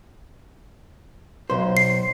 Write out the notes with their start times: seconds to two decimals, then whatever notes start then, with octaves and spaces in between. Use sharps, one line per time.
1.50 B1 C5
1.77 C7